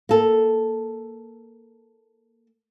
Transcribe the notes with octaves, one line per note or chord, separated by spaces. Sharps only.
A#3 A4